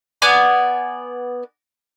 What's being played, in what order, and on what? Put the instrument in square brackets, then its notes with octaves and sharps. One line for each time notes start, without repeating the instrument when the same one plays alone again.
[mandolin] B3 D5 G#5